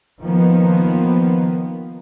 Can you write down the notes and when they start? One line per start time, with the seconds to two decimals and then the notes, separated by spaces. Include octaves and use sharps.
0.22 D#3 F3 A#3 B3